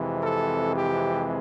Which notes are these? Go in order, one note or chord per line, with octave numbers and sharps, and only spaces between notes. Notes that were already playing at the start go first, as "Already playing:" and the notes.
Already playing: F2 C3 E3 G#3
A4
G4